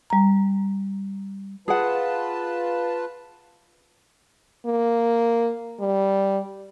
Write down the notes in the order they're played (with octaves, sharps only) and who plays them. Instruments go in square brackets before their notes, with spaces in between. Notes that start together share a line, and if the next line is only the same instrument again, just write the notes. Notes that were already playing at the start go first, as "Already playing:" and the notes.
[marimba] G3 A#5
[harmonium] F4 B4 A5 [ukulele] G#4 F#5
[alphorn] A#3
G3